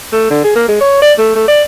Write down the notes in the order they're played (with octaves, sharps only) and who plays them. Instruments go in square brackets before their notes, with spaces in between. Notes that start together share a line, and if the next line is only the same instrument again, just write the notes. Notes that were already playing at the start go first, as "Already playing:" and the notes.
[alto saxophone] A3
D3
G#4
A#3
G#3
C#5
D5
A3
A3
D5